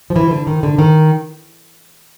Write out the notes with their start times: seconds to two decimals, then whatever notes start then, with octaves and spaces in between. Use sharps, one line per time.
0.10 F3
0.16 E3
0.31 D3
0.47 D#3
0.63 D3
0.78 D#3